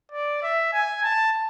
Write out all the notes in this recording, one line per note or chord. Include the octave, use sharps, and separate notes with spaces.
D5
E5
G#5
A5